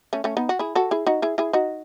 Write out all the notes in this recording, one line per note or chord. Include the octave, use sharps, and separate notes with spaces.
A3 C#4
A3 C#4
B3 D#4
F#4
E4 G#4
F#4 A4
E4 G#4
D#4 F#4
E4 G#4
E4 G#4
D#4 F#4